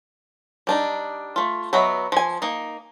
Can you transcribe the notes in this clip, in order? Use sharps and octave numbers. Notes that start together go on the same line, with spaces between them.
G3 D4 D#4
A3 F4
F#3 B3 D#5 E5 B5
F3 G#5
A#3 D#4